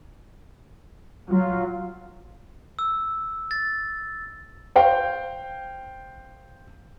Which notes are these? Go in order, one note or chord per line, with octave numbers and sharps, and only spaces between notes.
F#3 F4
E6
A6
C5 F5 G5